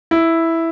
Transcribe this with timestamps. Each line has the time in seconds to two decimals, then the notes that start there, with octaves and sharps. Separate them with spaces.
0.11 E4